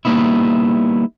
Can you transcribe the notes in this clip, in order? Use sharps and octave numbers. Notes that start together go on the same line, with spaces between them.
G3 A#3 B3 D#4 E4